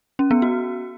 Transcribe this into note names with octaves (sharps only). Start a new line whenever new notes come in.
C#4
B3
F#4